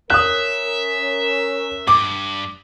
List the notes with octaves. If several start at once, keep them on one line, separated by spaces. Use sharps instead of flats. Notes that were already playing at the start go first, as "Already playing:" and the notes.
C#4 A#4 E5 D#6 F#6
G2 D6